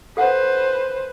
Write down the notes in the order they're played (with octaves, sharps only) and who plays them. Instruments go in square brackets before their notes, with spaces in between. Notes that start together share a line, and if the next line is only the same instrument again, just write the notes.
[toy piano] A4 F#5 [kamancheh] B4 C5